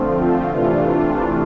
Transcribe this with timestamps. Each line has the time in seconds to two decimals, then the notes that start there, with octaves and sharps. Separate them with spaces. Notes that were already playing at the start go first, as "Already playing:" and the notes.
Already playing: D3 F3 A3 C4 F4
0.52 C3 E3 A3 D4 F4